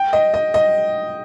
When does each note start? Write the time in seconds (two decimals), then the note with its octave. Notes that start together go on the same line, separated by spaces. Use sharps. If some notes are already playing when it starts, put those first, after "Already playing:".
Already playing: G5
0.13 D#5
0.34 D#5
0.54 D#5